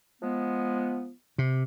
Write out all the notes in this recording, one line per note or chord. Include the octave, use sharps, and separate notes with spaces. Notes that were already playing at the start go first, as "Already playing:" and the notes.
F3 G#3 B3
C3